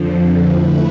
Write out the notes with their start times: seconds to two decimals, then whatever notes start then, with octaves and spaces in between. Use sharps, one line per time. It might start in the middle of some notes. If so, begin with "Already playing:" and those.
Already playing: F2 D3 F3
0.51 A3 E4 B4